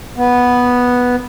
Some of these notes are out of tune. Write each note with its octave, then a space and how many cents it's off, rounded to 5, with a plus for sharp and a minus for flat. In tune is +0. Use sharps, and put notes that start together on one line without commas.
B3 -5